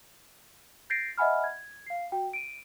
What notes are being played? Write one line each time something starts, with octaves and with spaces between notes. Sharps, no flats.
G6 A6 A#6 C7 D7
D#5 E5 F#5 G#5 B5 F6
G#6
F5 C7
F#4 G5
D7 D#7